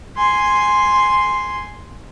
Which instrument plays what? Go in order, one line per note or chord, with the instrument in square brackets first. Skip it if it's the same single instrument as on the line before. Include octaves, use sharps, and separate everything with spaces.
[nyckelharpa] G#5 C6